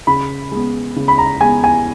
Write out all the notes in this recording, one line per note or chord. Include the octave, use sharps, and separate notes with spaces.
C#3 B5
G#3 B3
C#3
B5
A#5
G#3 B3 G#5
G#5